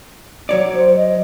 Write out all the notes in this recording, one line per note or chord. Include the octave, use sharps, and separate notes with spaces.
F#3 C#5 D5
C5
D#5